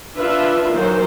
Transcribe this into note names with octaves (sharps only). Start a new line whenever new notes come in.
D4 F4 B4 E5
D#3 E3 F#3 C5